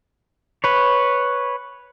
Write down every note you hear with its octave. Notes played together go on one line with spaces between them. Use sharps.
B4 C#5